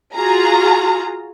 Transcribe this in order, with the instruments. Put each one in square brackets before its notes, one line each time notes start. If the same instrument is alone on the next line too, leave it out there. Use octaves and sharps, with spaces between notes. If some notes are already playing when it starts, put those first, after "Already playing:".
[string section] F4 F#4 G#4 A#5